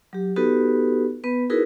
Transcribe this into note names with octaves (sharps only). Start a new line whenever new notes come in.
F#3 G4
B3 D#4 F#4 G4 A4 B4
B3 B4
D#4 E4 F#4 G#4 A#4 B4